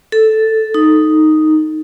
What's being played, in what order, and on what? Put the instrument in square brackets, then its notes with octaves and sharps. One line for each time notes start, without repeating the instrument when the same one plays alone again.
[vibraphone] A4
D#4